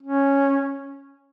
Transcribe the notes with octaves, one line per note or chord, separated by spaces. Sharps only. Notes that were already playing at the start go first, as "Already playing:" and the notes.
C#4